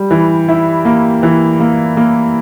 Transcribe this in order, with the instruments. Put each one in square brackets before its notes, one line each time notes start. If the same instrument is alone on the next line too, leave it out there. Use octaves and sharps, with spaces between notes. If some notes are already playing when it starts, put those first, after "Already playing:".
Already playing: [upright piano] G3
E3
E4
A#3
E3
A#3
A#3